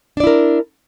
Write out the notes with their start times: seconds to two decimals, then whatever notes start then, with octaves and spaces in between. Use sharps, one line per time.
0.17 D4
0.20 D5
0.24 E4
0.27 A#4